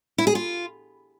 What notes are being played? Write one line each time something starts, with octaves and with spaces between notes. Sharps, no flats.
E4
G#4
F4